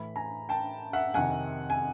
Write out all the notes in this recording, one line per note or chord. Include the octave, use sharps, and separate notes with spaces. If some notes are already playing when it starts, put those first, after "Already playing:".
Already playing: A2 E3 B5
G#5 A#5
G5 A5
E5 F#5
F2 C3 D#3 F#5 G#5
G#5